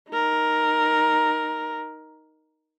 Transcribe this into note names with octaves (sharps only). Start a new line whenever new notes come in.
D#4 A#4